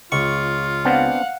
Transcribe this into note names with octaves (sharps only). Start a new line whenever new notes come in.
C#2 F4 C#6
B3 C4 D4 F5 F#5